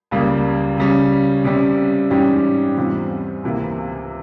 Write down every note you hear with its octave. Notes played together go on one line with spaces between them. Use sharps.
C#2 C#3 G3 A#3
C#3 G3 C#4
C3 G3 C#4
G#2 E3 G3 C#4 G4
E2 C3 G3 C4 F4
C#2 C3 E3 A#3